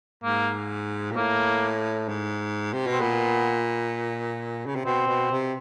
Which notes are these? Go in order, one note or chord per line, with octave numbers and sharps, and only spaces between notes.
G#2 A#3
A#2
A2 A#3
G#2
C3
B2
C4
A#2 B3
C#3
C3
B2 C4
B2
C3